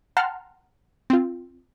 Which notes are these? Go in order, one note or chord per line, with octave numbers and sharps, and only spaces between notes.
F#5 G5 A5 A#5 C6 F6
C4 F4